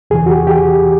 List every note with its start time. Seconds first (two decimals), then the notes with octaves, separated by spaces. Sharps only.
0.10 E2 C3 E3 G#4
0.26 F#4
0.30 G4
0.47 G4
0.51 G#4